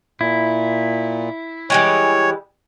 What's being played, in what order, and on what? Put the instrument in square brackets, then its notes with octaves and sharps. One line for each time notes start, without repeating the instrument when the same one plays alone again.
[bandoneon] A#2 [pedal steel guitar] E4
[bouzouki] E3 G3 G#3 [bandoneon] C#5